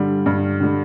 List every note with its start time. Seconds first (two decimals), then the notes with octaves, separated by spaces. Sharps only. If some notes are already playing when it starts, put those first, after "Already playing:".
Already playing: G2 D3 G3
0.26 G2
0.60 D3 G3